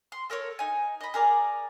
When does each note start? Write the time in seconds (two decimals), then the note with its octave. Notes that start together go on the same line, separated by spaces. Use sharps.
0.12 C6
0.30 A4 A#4 C5 C#5
0.59 D#4 G#5
1.01 D#5 B5
1.14 G#4 A#4 D5